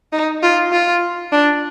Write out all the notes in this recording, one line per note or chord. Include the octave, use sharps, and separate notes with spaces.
D#4
F4
F4
D4